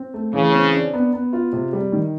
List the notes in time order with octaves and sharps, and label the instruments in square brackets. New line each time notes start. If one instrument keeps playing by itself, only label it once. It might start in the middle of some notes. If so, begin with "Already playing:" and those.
Already playing: [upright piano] C4
A3
[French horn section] C#3 [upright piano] E3
[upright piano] C4
D4
B3
B3
F4
C3
G3
D#3